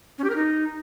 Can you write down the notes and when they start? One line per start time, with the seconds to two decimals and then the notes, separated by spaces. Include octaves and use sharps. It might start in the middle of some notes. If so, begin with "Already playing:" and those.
0.18 C#4
0.24 G4
0.30 A#4
0.35 D#4